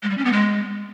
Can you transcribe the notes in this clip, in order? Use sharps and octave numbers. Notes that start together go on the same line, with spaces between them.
G#3
G3
C#4
B3
G#3